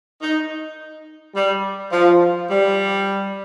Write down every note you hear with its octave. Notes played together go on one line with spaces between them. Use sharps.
D#4
G3
F3
G3